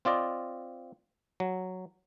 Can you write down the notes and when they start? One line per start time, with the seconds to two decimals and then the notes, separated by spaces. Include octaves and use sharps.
0.05 C4 F4 D5 D#5
1.40 F#3